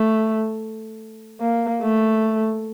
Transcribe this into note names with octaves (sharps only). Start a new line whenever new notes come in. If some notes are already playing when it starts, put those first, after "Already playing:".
Already playing: A3
A#3
A3